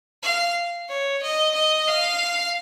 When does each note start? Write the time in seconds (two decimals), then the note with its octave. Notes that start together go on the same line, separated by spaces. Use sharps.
0.23 F5
0.89 C#5
1.22 D#5
1.55 D#5
1.88 F5